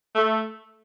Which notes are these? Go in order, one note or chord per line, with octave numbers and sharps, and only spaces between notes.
A3